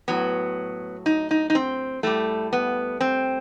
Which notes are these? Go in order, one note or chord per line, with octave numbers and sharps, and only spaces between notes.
A2 F#3 B3
D#4
D#4
D#4
C4
A2 G3 A3
B3
C4